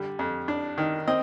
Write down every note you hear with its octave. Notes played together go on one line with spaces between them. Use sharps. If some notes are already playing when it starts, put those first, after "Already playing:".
Already playing: D3 G3
F2
D4
D#3
C4 D#5